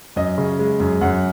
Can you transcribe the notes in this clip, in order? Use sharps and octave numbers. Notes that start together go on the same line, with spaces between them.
F#2 D#5
C#3
G#3
F#2
F#2 F#5